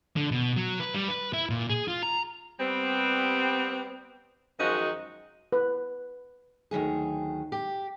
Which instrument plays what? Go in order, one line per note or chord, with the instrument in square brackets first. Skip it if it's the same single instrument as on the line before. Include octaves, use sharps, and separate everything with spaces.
[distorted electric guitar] D3
B2
F#3
B4
G3
B4
E4
A#2
G#4
F4
A#5
[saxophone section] G3 B3 C4
F#2 D#3 F3 G#3 D#4 F#4
[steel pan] B4
[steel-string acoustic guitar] D2 D#3 F#3 G#4
G4